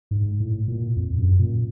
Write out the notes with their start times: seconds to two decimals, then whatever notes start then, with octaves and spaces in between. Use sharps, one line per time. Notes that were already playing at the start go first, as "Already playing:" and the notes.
0.11 G#2
0.40 A2
0.68 A#2
0.96 F2
1.18 F#2
1.39 A#2